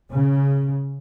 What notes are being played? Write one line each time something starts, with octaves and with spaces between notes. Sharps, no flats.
C#3